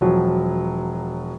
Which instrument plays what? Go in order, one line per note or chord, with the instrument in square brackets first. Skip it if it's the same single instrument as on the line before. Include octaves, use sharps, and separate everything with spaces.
[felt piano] E1 F3 F#3